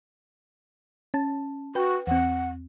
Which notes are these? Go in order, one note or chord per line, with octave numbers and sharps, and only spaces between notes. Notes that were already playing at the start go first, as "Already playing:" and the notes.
C#4 A5
F#4 B4 G5
E2 C4 F#5